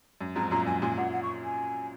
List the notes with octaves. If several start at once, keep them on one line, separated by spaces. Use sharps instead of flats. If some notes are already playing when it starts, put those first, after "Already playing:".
F#2
F2 G#2 A#5
F#2 A#2 A#5
F#2 G#5
F#2 A#2 G#5
F#2 A#2 F#5
F#5
C#6
G#5